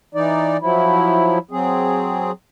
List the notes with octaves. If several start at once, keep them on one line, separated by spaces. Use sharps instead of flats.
E3 D#4 D5
F3 F#3 E4
F#3 C4 G#4